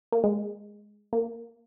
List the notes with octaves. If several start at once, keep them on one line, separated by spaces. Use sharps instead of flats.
A#3
G#3
A#3